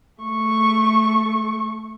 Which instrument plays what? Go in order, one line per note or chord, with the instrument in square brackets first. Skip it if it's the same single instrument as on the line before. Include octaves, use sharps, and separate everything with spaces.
[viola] A3 C#6